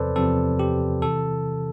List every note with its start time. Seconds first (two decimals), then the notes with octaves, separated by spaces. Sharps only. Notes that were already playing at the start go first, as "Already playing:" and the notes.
Already playing: E2 C3 F3 C4 A4 B4 C5 D5
0.16 E2 C3 F3 C4 A4
0.59 G4
1.02 C3 E3 A4